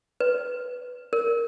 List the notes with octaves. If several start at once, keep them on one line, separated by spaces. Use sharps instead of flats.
B4
A#4